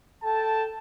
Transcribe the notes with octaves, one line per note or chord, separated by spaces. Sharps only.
A4 G5 A5